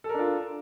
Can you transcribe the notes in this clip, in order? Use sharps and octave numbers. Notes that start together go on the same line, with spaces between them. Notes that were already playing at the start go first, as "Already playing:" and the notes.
D4 F4 A4 A#4